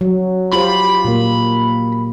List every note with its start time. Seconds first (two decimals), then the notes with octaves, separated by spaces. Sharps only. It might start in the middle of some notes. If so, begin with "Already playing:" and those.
0.01 F#3
0.53 F4 G4 C5 B5
1.05 A#2 A#3